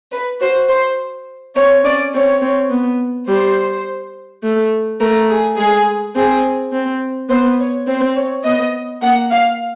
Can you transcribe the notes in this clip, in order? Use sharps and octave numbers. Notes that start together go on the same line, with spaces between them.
B4
F#4 C5
C5
C4 C#5
C#4 D5
C4 C#5
C4
B3
G3 C5
A3
A3 A#4
G#4
G#3 G#4
C4 G#4
C4
B3 C5
C#5
C4 C5
C#5
B3 D#5
A#3 F#5
F5